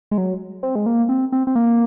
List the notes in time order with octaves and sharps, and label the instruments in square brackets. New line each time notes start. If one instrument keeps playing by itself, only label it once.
[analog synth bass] G#3
F#3
C4
G#3
A#3
C4
C4
C4
A#3